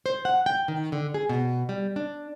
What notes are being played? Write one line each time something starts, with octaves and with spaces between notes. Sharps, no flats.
C5
F#5
G5
D#3
D3
G#4
B2
G3
D4